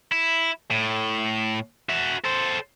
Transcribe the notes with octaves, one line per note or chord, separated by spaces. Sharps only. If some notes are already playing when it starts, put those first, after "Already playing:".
E4
A2
F#4 E5
A4 C5